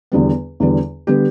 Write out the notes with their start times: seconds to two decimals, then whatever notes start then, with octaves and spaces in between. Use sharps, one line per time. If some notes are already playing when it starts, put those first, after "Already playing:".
0.12 E2 D3 G3 B3
0.60 E2 D3 G3 B3
1.07 D3 G3 B3 G4